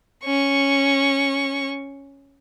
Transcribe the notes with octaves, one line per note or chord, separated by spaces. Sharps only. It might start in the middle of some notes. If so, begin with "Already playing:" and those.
C#4 C#6